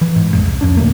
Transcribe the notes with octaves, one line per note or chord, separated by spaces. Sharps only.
E3
G#2
G#1 F2 G#2
C2
F2 C#4 D4
D2 A2 A3 A#3